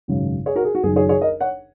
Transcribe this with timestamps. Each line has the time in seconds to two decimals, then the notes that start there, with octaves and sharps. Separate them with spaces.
0.08 G#1 F#2 C#3 F#3
0.46 G#4 C#5
0.56 F#4 A#4
0.65 G#4
0.75 F#4
0.83 F#1 F#2 D#3 F#3 G#4
0.96 G#4 C#5
1.09 G#4 C#5
1.21 A#4 D#5
1.40 C#5 F#5